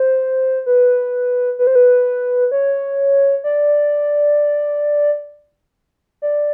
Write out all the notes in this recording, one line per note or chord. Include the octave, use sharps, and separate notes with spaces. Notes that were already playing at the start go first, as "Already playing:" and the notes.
Already playing: C5
B4
B4
C5
B4
C#5
D5
D5